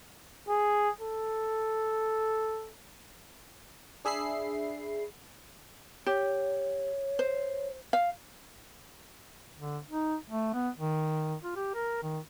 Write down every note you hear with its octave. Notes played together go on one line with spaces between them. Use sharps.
G#4
A4
D4 G#4 E5 B5 C7
G4 C#5
C5
F5
D3
D#4
A3
B3
D#3
F4
G4
A#4
D#3